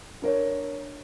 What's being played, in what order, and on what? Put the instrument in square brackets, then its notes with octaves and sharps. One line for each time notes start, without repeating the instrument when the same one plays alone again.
[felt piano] D4 A#4 C#5